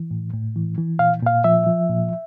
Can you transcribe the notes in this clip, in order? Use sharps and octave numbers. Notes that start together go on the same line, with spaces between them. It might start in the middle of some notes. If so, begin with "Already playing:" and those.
Already playing: E3
A2
A2
E3
E3
A#2 F5
A#2 F5
F3 E5
F3
A#2